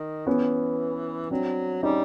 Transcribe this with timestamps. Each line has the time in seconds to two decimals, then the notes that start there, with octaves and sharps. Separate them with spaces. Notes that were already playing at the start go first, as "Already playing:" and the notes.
Already playing: D#3
0.26 E3 B3 C#4
1.31 F#3 C4 D4
1.83 G3 C#4 D#4